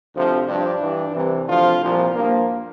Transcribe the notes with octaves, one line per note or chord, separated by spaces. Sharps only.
D2 C3 F3
G2 F3 D4
G2 E3
C2 C3 E3
D2 C3 F3 F4
C2 A#2 F3
G2 F3 A#3